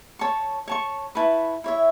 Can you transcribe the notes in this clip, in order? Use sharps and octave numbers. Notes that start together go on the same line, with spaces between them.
C#5 A5 C#6
C#5 A5 C#6
E4 B4 A5 C#6
E4 C#5 E5